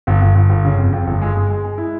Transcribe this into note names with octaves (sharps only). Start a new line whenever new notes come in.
G1
G1
G1
G1
C#3
F2
F2
G1
G#3
G#3
G#3
G#3
E4